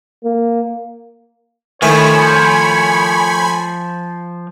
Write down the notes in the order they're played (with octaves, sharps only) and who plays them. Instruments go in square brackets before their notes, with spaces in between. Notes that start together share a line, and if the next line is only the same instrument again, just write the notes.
[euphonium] A#3
[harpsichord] A2 D#3 E4 [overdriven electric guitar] F3 [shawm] C#5 [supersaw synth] G#5 B5